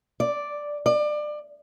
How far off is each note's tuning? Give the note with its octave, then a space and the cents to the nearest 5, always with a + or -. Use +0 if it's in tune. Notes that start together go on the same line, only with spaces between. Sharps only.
D5 +0
D5 +25